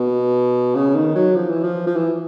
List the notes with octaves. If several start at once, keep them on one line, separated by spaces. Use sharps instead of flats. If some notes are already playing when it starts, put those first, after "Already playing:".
Already playing: B2
C#3
D#3
F#3
F3
E3
F3
F3
E3